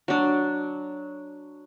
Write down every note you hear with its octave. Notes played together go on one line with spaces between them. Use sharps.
F#3 D4